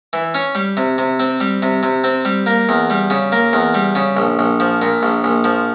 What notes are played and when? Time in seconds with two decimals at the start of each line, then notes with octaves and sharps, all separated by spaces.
0.13 E3
0.34 C#4
0.55 G3
0.77 C3
0.98 C3
1.20 C4
1.40 G3
1.63 C3
1.83 C3
2.04 C4
2.25 G3
2.46 A#3
2.69 E2
2.90 G3
3.10 C#3
3.32 A#3
3.53 E2
3.74 G3
3.95 C#3
4.17 A#1
4.39 A#1
4.60 F3
4.82 A#2
5.03 A#1
5.24 A#1
5.44 F3